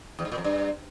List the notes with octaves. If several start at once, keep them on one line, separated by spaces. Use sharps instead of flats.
E2
G#2
A#2
F2
G2